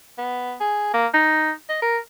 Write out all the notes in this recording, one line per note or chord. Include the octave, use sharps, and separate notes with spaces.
B3
G#4
A#3
D#4
D#5
A#4